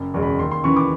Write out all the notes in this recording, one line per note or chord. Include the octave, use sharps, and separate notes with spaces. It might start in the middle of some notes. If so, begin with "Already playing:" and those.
Already playing: F#1
E2 B2 G#3
B5
D#2 C6
C6
C#3 E3 C#6
D6